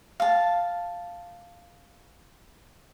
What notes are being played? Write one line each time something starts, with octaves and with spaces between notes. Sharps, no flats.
F5 A5